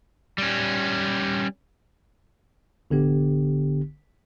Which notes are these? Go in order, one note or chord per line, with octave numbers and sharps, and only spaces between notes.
G3 C#4
A1 D3 B3 G4